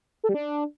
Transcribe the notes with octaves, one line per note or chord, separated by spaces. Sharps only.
A4
G3
D4